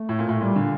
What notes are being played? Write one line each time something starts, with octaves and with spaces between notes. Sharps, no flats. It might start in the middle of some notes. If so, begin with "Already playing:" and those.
Already playing: A3
A2
A#2
A2
A#2 G3
A#2 D3